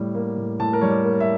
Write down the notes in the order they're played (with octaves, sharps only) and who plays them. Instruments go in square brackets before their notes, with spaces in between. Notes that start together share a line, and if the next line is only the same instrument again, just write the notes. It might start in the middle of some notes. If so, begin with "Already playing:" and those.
Already playing: [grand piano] A2 G3
A#3
A2
A2 A5
A#4
G3 C#5
D5
A#3
E5